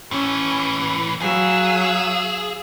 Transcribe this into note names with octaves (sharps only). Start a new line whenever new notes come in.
A2 E3 C#4
F#3 G#4 F5 E6